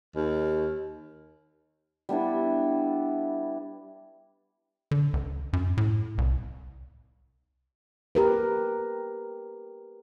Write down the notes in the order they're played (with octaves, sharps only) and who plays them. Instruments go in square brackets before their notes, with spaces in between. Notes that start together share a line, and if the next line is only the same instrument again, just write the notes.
[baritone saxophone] D#2
[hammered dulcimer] G3 B3 D4 E4
[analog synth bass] D3
C#2
F#2
A2
C2
[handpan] G4 A#4 B4